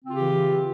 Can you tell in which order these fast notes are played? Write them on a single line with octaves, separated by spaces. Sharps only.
C4 C#3 F4 G4 E3